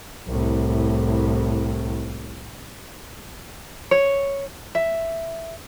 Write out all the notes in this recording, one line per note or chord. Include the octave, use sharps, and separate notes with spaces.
C2 A2
C#5
E5